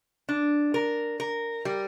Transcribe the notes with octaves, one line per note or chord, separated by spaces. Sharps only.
D4
A#4
A#4
G3